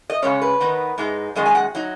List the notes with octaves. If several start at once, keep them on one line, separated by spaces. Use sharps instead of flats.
D#5
C#3 G#3 C#4 C#5
B4
D#3 B3 D#4
G#2 G#3 D#4
F#2 D#3 G#3 D#5
G#5
F#5
F#3 D#4